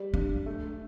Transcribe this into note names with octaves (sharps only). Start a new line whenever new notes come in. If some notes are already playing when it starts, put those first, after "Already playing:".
Already playing: G3
D4
A3